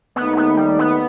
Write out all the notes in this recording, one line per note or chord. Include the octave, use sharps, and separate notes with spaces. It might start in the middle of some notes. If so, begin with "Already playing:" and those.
D#2 D#3 A3 B3 D#4
B3
G3
B3